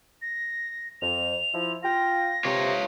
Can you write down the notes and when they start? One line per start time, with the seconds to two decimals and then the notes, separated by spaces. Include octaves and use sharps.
0.22 A#6
1.02 F2 F7
1.54 F3 E4
1.83 F4 G5 A#6
2.45 C3 F4 C#5